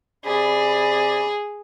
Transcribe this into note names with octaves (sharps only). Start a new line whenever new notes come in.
C3 G#4 D5 B5